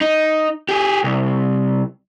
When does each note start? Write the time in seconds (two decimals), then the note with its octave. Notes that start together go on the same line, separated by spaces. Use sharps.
0.01 D#4
0.69 G4 G#4
1.04 C2